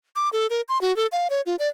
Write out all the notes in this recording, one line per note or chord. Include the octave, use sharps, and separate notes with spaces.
D6
A4
A#4
C6
F#4
A4
F5
C#5
F4
D5